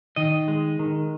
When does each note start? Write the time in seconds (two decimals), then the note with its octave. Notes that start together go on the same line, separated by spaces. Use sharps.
0.16 D#3 D#5
0.48 G#3
0.79 D#3